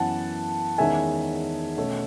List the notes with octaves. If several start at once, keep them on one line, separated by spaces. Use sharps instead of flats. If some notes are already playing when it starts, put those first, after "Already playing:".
Already playing: F#2 E3 B3 F#5 A5
E2 D#3 G#3 C#4 E5 G#5
B2 A3 C#4